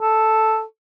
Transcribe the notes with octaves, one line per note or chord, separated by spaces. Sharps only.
A4